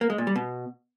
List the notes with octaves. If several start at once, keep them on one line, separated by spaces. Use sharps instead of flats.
A#3
G#3
A#2
G3
B2